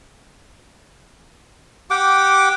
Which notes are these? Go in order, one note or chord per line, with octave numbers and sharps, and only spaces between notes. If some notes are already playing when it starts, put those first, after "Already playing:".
G4 F#5 G5 D6